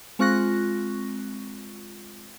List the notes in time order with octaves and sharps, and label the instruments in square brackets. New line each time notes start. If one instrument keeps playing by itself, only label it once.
[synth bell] G#3 C4 F4 C#6 F#6 A#6